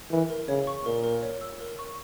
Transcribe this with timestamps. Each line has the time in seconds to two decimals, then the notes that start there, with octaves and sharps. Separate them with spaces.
0.11 E3 A#4
0.30 A#4
0.48 C#3 C#5
0.67 C#6
0.86 A#2 A#4
1.04 A#4
1.23 C#5
1.41 E6
1.60 A#4
1.79 C#6